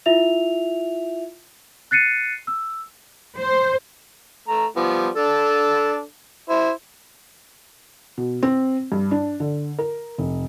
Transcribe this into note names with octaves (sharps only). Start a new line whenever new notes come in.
E4 F4 E5 F7
F#6 A6 C7 C#7 D#7
E6
C5
A3 A#5
F3 G3 B3
D4 A4
E4 C5
B2
C4
G2
D4
D3
A#4
F1